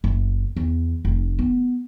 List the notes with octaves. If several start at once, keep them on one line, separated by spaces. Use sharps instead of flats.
F#1
E2
F1
B3